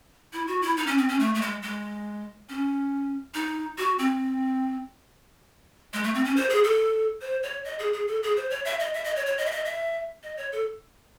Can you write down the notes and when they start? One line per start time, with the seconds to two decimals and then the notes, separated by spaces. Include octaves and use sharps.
0.33 E4
0.48 F#4
0.62 E4
0.77 D#4
0.87 C#4
0.98 C4
1.09 C#4
1.20 A3
1.35 A3
1.42 G#3
1.62 G#3
2.49 C#4
3.34 D#4
3.78 F#4
3.99 C4
5.93 G#3
6.04 A3
6.14 C4
6.25 C#4
6.36 C5
6.50 G#4
6.64 A4
7.21 C5
7.43 C#5
7.65 D#5
7.79 G#4
7.93 G#4
8.08 A4
8.23 G#4
8.37 C5
8.50 C#5
8.65 E5
8.80 D#5
8.94 E5
9.04 D#5
9.16 C#5
9.26 C#5
9.38 D#5
9.46 E5
9.51 D#5
9.65 E5
10.23 D#5
10.37 C#5
10.52 A4